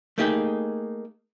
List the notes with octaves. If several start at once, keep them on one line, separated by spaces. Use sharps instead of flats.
A3 A#3 D#4 G4 G#4